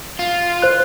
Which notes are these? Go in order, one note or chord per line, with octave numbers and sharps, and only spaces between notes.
F4
C5 F#6